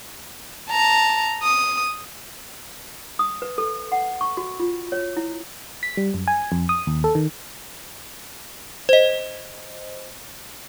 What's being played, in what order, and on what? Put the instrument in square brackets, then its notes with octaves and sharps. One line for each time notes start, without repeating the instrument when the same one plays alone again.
[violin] A5 A#5
D#6
[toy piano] D#6
B4
A4
F#5
C#6
F#4
F4
C#5
E4
[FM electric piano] B6
G3
F#2
G#5
F2
D#6
D#2
A4
D#3
[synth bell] C5 D#5